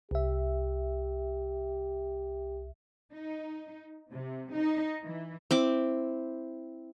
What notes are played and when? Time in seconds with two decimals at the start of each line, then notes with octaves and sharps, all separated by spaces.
0.11 C2 G4 E5
3.13 D#4
4.12 C3
4.54 D#4
5.02 E3
5.51 C4 E4 D6